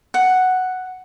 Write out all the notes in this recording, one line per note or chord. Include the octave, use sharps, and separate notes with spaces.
F#5